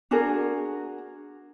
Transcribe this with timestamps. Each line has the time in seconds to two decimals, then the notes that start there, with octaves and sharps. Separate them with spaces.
0.11 D4 F#4 G#4 A#4